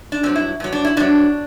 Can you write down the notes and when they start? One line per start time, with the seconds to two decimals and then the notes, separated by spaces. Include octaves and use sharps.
0.12 D4
0.23 G2 F#3 C4
0.36 E4
0.60 G2 F#3
0.72 D4
0.85 E4
0.97 G2 F#3 D4